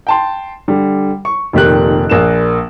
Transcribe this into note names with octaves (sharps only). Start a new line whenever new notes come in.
G5 A5 C6
D3 G3
C#6
F1 A#2 D#3 G4 A#4 F#6
A#1 A#3 D5 E7